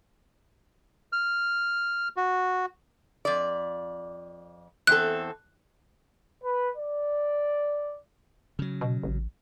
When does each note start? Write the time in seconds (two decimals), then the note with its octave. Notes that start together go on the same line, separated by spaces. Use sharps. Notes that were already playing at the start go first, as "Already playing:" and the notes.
1.13 F6
2.16 F#4
3.25 F2 D5
4.87 E2 C4 A4 F#6
6.43 B4
6.76 D5
8.59 C#3 F#3
8.81 B2
9.03 A1